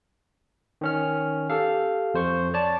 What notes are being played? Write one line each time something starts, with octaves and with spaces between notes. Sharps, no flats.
D#3 C#4 F6
G4 A4 F5
F2 C5 C#6
C#5 D5 A5